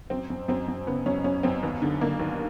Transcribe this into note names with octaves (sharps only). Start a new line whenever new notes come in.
F#2 C4
F#2
F#2 C4
F#2
C#3 B3
F#2 C#4
F#2 C#4
F#2 C4
D#2 B3
D3
D3 A#3
D#2